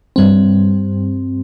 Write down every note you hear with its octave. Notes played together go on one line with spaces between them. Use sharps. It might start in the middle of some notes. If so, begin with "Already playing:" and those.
G2 G3 C4